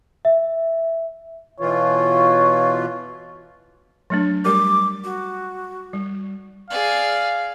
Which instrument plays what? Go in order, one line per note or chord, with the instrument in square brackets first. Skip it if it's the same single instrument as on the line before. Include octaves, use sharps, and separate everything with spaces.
[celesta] E5
[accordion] B2 E3 F4 [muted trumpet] C#5
[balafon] F#3 A3 D4
[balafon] G3 G4 A#4 [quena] D6
[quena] F#4
[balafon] G3
[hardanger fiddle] G#4 D5 [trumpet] F5